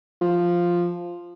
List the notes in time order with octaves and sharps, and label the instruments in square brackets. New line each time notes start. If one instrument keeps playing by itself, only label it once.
[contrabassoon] F3